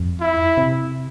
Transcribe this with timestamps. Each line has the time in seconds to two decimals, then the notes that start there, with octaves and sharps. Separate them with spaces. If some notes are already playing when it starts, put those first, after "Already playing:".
Already playing: F2
0.21 E4
0.57 C3